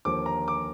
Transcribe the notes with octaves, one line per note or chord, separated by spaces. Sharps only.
D#2 D3 F3 A#3 D6
A#5
D6